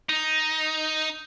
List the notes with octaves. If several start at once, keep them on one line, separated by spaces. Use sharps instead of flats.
D#4